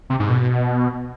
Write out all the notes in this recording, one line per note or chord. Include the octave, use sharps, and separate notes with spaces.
C3
G#2
B2